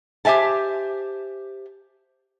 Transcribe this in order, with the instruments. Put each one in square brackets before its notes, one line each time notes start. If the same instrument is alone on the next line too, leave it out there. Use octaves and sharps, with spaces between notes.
[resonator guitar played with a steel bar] G4 C5 E5 G#5 A5